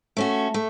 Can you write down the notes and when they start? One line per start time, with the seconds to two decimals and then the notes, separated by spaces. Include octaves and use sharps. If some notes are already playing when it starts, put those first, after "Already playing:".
0.17 A3 C#4 F#4
0.54 A3